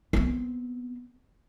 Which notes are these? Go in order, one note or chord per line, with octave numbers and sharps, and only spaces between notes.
B3 C4